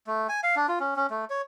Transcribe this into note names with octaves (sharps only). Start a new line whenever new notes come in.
A3
G#5
F5
D4
F4
C#4
C#4
A3
C#5